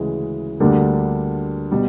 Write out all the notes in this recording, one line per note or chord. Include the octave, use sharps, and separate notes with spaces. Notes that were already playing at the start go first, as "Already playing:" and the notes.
Already playing: D2 C#3 E3 G#3
D2 D3 G3 A#3 D4
B2 G3